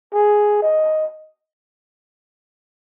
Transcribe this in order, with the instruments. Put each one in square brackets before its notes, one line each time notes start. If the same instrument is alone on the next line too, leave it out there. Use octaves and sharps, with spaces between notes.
[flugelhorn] G#4
D#5